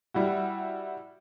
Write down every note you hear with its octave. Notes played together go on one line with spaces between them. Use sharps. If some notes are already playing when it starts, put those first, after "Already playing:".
G3 E4 F#4